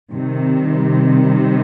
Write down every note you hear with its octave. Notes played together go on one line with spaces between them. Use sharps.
C3 D#3 G3